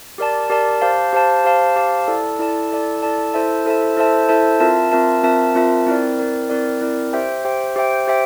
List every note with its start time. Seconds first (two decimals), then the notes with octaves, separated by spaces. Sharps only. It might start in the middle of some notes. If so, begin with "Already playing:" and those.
0.18 G4 A#4 D5 A5
0.50 G4 A#4 D5 A5
0.81 G4 C5 F5 A5
1.13 G4 C5 F5 A5
1.44 G4 C5 F5 A5
1.76 G4 C5 F5 A5
2.07 E4 A4 D5 A5
2.39 E4 A4 D5 A5
2.71 E4 A4 D5 A5
3.03 E4 A4 D5 A5
3.34 E4 A4 C5 E5 A5
3.65 E4 A4 C5 E5 A5
3.97 E4 A4 C5 E5 A5
4.29 E4 A4 C5 E5 A5
4.60 C4 F4 A#4 E5 A5
4.92 C4 F4 A#4 E5 A5
5.23 C4 F4 A#4 E5 A5
5.55 C4 F4 A#4 E5 A5
5.86 C4 E4 A#4 D5
6.18 C4 E4 A#4 D5
6.50 C4 E4 A#4 D5
6.81 C4 E4 A#4 D5
7.13 G4 C5 E5 G5
7.45 G4 C5 E5 G5
7.76 G4 C5 E5 G5
8.07 G4 C5 E5 G5